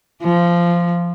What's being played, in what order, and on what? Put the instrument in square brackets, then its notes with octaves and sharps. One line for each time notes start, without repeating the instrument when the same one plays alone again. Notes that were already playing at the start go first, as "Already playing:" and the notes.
[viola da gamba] F3